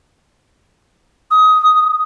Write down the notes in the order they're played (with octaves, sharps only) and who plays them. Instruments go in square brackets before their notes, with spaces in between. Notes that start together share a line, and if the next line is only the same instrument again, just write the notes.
[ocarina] D#6